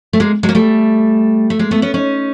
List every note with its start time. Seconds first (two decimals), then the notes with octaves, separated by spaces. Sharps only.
0.13 A3
0.20 G#3 A#3
0.43 F#3 G#3
0.49 A#3
0.55 G3 A3
1.50 A3
1.59 G#3 A#3
1.71 A3 B3
1.82 B3 C#4
1.94 C#4 D#4